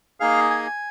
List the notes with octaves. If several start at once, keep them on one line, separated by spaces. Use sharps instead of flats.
A#3 D#4 G#4 F5
G#5